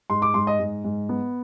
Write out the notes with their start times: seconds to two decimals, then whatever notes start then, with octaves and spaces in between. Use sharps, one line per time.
0.10 G#2 C6
0.22 D6
0.34 G#2 C6
0.47 D#5
0.59 G#2
0.84 G#2
1.09 B3